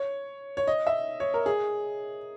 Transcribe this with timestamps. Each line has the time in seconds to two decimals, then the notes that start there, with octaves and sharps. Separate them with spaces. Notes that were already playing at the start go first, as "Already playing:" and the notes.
Already playing: C#5
0.57 C#5
0.67 D#5
0.87 E5
1.20 C#5
1.34 A#4
1.46 G#4